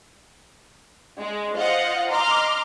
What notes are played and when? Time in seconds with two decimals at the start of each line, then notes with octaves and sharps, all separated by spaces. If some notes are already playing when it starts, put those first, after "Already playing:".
1.20 G#3
1.55 F4 C5 D#5 F5 F#5
2.09 D#5 A#5 C6 D6 F6